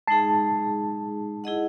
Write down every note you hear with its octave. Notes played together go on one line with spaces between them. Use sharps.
G#3 D#4 G#4 A5
E4 G#4 D#5 F#5